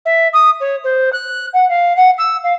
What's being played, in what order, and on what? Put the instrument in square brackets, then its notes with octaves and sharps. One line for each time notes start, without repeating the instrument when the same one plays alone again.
[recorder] E5
D#6
C#5
C5
F#6
F#5
F5
F#5
E6
F5